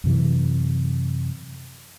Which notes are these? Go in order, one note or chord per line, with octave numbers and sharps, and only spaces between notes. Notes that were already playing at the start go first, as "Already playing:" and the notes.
F#2 C3 E3